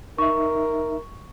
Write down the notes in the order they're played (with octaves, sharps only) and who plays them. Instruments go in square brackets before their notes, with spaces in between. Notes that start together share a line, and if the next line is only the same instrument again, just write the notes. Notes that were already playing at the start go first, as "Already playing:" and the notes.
[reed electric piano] D#4 E5 [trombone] A#4 [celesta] C#6